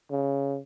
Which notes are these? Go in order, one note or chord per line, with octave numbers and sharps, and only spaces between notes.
C#3